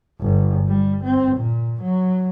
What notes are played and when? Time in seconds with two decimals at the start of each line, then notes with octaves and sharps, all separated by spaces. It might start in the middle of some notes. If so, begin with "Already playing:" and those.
0.21 G1
0.67 G3
1.04 C4
1.36 A#2
1.82 F#3